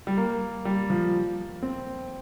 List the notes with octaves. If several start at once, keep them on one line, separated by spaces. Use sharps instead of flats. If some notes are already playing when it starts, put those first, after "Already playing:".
G3
A#3
G3
F3
C4